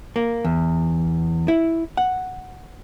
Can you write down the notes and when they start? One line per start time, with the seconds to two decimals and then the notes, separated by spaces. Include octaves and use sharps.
0.16 A#3
0.44 E2
1.48 E4
1.97 F#5